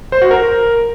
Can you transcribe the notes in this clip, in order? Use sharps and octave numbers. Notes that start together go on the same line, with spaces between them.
C5
F#4
A#4